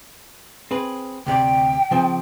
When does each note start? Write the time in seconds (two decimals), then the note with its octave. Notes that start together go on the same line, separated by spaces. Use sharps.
0.71 C4 G#4 B4
1.27 D2 C3 D5 G5
1.91 C#3 F3 C4